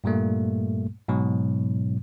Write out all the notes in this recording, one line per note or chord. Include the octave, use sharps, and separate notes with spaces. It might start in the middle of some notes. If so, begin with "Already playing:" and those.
G2 A#2 G3 A3 A#3
G#2 B2 F#3